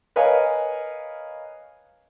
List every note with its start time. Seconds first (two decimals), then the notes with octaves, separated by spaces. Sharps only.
0.16 A#4 B4 C#5 D#5 F5 G#5